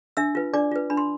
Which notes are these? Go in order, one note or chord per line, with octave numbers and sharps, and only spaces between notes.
D4 E5 E6
F4 B4
D4 D5 D6
F4 B4
D4 B5
C6